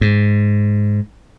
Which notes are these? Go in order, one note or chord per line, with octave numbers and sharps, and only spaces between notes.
G#2